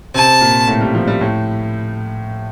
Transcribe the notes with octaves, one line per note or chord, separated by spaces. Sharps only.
C3 C4 A5
A#2 A#3
A2 A3
G3
F3
G3
A2 A3